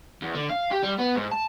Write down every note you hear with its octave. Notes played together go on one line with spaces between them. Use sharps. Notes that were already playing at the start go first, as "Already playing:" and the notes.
E2
D3
F5
G4
G3
B3
G#2
A5